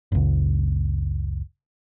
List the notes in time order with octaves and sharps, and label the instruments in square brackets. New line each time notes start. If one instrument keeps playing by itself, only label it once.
[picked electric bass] F#1 C#2